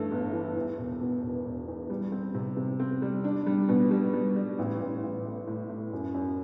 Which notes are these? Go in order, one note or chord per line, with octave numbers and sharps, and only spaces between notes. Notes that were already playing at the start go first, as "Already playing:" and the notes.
Already playing: G2 E3 A3
G1
E3
E2
E1
B2
E1
E1
E2
G3
C4
C3
C3
C4
G3
D4
G3
B2
G3
G3
G3
A1
A1
A1
A2
A2
A2
F#2
F#2